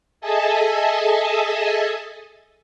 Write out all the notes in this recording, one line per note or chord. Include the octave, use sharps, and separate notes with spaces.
G#4 A4 D#5 E5 G#5 A5